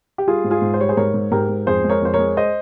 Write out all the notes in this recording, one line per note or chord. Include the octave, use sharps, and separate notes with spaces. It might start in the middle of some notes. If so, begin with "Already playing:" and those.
G4
G3 F4 G#4
G#2
F4 G#4
G#2
C5
G3 C#5
G#4 C5
G#2 A#4 C#5
G#2
G#2 G4 A#4
G#2
F2 G#4 C5
G#3
A#4 C#5
F2 C5
A#4 C#5
G#3
C5 D#5